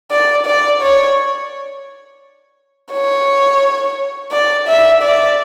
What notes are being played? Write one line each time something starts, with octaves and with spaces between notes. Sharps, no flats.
D5
D5
C#5
C#5
D5
E5
D5